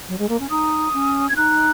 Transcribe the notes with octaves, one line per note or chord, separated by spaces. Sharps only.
F#3
G#3
A#3
C#4
D#4 D#6
C#4
C#4 G#6
D#4 F#6